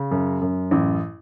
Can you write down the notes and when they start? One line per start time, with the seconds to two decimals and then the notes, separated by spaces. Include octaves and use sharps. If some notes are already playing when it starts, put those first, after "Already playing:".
Already playing: C#3
0.11 F#2
0.41 F#2
0.71 A1